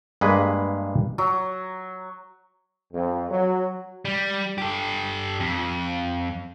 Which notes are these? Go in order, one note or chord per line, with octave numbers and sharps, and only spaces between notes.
G2 G#3 A#3 B4
F#3
F2
F#3
G3
G4 A4
F2